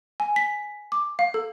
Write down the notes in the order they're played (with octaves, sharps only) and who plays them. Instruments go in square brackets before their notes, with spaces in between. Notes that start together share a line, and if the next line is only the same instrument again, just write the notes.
[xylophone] G#5
B6
D6
F5
A4